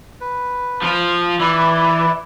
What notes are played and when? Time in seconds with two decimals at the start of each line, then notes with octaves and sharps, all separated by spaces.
0.21 B4
0.83 F3 F4
1.40 E3 E4 B4 D5